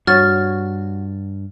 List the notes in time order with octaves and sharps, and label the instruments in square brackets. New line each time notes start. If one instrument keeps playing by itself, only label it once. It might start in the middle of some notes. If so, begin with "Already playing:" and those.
[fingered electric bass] G2 [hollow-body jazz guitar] F#4 C#5 [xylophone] F6 A6